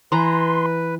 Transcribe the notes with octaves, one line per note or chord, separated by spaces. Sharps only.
E3 B4 A#5 C6